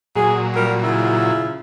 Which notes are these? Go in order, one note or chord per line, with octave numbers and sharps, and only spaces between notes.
A#2 F#3 G#4
G3 F4 A#4
C#3 E4 F4